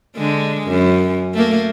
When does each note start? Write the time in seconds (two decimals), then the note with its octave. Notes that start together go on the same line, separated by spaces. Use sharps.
0.16 D3 G#3
0.68 F#2
1.34 A3 A#3